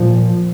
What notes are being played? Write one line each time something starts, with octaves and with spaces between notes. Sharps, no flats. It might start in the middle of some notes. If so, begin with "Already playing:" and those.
Already playing: A#2 F3